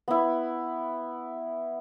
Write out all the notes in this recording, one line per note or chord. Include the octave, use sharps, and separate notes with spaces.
B3 E4